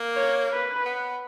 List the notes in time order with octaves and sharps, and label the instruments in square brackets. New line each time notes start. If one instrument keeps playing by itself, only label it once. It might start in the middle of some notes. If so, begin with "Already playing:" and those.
Already playing: [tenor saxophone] A#3
[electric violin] C#5
B4
[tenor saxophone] B3